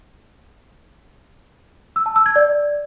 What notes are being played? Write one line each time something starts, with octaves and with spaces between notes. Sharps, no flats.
E6
A5
E6
G#6
D5